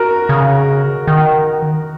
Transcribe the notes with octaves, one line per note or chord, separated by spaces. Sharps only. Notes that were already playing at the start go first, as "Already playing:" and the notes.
Already playing: F#4 A#4
C#3
D#3